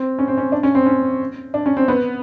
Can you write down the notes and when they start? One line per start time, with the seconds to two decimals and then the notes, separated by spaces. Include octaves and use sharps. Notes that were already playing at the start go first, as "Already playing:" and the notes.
Already playing: C4
0.19 C#4
0.28 C4
0.38 C#4
0.52 D4
0.63 C#4
0.75 C4
0.86 C#4
1.54 D4
1.66 C#4
1.77 C4
1.88 B3